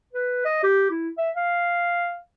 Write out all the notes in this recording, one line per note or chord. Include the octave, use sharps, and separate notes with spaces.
B4
D#5
G4
E4
E5
F5